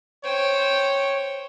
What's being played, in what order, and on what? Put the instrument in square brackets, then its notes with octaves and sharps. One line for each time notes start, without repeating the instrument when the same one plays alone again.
[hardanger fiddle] C5 G5 [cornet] C#5